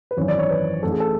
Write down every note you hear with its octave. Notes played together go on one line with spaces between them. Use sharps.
B4
G#1 F#2 E3 C#5
D5
C#5
B4
A1 A2 E3 A4
G#4
A4